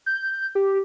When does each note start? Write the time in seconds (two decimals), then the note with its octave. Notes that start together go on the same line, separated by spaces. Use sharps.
0.06 G6
0.55 G4